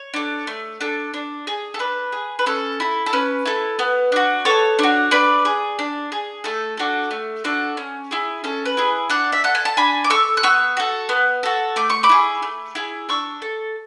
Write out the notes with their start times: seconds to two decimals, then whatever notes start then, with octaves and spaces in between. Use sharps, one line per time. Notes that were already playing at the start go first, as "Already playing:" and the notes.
Already playing: C#5
0.14 D4 A4
0.47 A3
0.81 D4 A4
1.14 D4
1.47 G#4
1.74 A4
1.79 D4 B4
2.12 G#4
2.39 B4
2.46 C#4 A4
2.80 E4 A4
3.06 A4
3.13 C#4 B4
3.45 E4 A4
3.79 B3
4.12 D4 F#4
4.45 B3 A4 C#5
4.79 D4 F#4
5.11 D4 B4 D5
5.45 G#4
5.79 D4
6.12 G#4
6.44 A3 A4
6.77 D4 F#4 A4
7.11 A3
7.44 D4 F#4 A4
7.77 C#4
8.11 E4 G#4
8.44 C#4 A4
8.65 B4
8.77 E4 G#4
9.09 D4 D5 F#5
9.32 E5
9.44 A4 F#5
9.55 G#5
9.65 A5
9.77 D4 G#5 B5
10.04 D6
10.10 A4 C#6 E6
10.37 F#6
10.43 B3 C#6 E6
10.77 F#4 A4
11.09 B3
11.43 F#4 A4
11.76 A3 D6
11.90 C#6
12.03 B5 D6
12.09 E4 G#4
12.42 A3
12.75 E4 G#4
13.09 D4 C#6 E6
13.42 A4